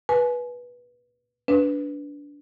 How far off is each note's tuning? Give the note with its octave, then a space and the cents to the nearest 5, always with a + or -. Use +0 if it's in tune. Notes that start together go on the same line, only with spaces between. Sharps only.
B4 -15 G#5 +30
D4 -20 B4 +0